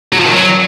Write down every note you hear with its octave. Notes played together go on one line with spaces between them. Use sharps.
F#3
F3
D#3
F#3